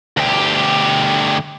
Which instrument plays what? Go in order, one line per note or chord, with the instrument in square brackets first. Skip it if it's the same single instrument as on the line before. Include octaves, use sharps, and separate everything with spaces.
[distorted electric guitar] D2 G4